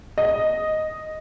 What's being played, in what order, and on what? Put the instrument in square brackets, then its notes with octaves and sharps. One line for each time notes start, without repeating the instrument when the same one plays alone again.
[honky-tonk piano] D#5